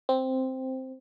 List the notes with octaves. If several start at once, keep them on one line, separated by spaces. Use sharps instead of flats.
C4